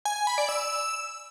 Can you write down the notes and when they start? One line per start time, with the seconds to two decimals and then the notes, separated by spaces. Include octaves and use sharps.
0.05 G#5
0.16 G#5
0.27 B5
0.38 D5
0.49 E6